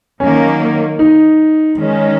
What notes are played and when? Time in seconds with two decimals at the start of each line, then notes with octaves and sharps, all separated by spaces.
0.20 D#3 F#3 A#3 C#4
0.99 D#4
1.77 D#3 G#3 C#4